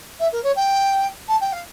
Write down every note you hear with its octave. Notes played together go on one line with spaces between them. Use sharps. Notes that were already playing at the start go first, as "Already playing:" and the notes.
E5
A#4
C#5
G5
A5
G5
F5